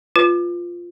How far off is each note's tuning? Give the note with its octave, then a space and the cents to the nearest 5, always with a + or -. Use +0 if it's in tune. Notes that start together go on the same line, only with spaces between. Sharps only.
F4 +0 B4 +5